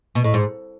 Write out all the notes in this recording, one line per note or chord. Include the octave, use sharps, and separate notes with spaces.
B2
A2
G#2